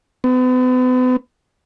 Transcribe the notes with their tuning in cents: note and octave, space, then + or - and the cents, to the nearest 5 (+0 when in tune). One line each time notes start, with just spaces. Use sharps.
B3 +40